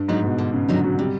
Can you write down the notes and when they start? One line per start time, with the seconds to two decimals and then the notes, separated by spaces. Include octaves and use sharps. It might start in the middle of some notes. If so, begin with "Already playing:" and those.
Already playing: G2
0.08 G#2 F#3 B3 D#4
0.24 B2
0.38 D3
0.53 C#3
0.68 D3 F#3 B3 D#4
0.83 F#3
0.98 C3 G3